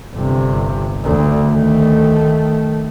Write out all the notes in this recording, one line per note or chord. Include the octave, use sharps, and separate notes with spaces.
G1 C3
D2
D#3 A3